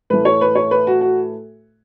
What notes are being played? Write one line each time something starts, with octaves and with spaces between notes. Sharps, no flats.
A2 E3 A3 B4
C#5
B4
C#5
B4
F#4
F#4